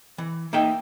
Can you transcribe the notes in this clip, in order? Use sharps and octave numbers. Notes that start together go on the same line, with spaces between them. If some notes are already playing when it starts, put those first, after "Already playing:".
E3
A#3 D#4 E5 G5